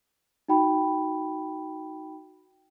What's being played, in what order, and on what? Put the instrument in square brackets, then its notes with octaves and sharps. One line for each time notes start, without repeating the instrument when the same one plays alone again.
[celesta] D#4 F#4 G5 B5